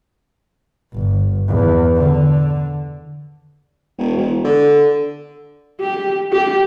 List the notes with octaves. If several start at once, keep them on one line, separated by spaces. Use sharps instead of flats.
G1
E2
D3
E1
E1
D3
G4
G4